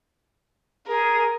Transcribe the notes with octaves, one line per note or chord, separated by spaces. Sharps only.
G#4 A#4